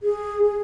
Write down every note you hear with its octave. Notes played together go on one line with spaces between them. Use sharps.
G#4
G#4